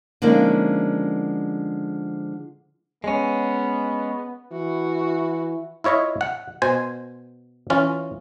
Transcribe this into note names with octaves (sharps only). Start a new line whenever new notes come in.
D3 F3 G#3 A#3 C#4 D#4
G#3 B3 C#4
E3 F#4
E4 F4 C#5 D#5 E5
F#5
B2 C5 G#5
E3 C#4 F4